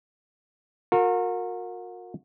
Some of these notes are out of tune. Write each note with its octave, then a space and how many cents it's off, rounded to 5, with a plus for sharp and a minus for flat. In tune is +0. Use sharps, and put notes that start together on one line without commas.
F#4 -40 A#4 -20